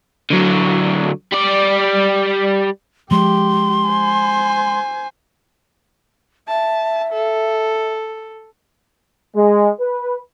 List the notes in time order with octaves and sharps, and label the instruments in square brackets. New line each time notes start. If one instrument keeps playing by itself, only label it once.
[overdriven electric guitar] D3 F#3
G3 D5
[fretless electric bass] F3 G#3 [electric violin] G4 [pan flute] C6
[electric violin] C5 G#5
[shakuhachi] E5 [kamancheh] A5
[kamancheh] A4
[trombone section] G#3
B4